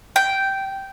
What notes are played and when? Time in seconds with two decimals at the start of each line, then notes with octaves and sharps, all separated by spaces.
0.16 G5